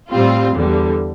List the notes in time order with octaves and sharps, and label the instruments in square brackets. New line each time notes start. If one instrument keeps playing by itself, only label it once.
[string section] A2 G3 C4 F4
E2 D3 G3